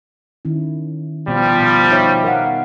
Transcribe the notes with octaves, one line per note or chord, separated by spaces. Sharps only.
D#3 C#4 E4
B2 F3 G3 B3
B2
D#4 C#5 E5
A#4 F5 F#5